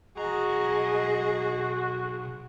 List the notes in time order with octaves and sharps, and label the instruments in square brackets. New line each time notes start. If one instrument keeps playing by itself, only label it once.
[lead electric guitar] B1 A#5 [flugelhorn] F#4 [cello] G#4 [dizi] D#5